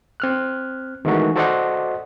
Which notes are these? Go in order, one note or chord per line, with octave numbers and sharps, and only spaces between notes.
C4 F6 F#6
D#3 E3 G#3 A3 F#4
F#4 A4 C5 D5 D#5 F#5